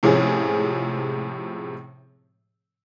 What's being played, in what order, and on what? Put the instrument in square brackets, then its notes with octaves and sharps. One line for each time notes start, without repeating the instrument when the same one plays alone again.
[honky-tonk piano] A2 C3 F3 G#3 C#4 G#4